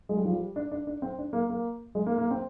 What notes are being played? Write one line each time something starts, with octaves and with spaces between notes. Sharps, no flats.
G#3
G3
F3
G3
D4
D4
D4
C4
D4
A#3
A#3
G#3
A#3
A#3
C4